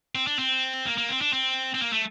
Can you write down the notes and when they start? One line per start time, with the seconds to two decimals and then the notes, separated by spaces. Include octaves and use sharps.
0.15 C4
0.27 D4
0.39 C4
0.86 A#3
0.98 A#3
1.09 C4
1.21 D4
1.33 C4
1.74 C4
1.81 A#3
1.93 A3